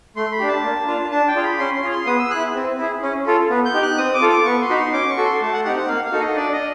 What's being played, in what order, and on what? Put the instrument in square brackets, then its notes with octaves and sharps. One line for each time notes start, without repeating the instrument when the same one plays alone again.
[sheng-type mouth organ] A3 C6
B5
D4 G4
A5
A#3
D4 F4
D4 A5
G5
F4 G#4
B5
C#4 C6
C6
F4 G#4
C6
B3 D#6
E6
E4 G#4 F#6
C4
E4 G#4
C#4
F4 A4
B3
G6
D#4 G4
F#6
C4 D#6
D6
F4 A4
D6
B3 C#6
C6
D#4 F#4 B5
C6
C#4 D6
C#6
F#4 A4
C6
A3 A5
F#5
C4 D#4 G4 F#5
F#5
A#3 F5
F5
D#4 F#4 A4
D#5
D4 D5
D#5